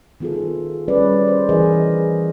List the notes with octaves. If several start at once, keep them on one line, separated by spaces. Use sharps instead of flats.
D#3 B3 F4 G#4 A4
G3 C#4 G#4 B4 D5
C5
E3 B3 G#4 A#4 B4 D#5